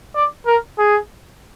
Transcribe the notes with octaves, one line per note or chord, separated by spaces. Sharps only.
D5
A#4
G#4